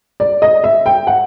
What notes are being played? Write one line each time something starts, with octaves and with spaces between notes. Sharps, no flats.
D5
D#5
E5
G5
F#5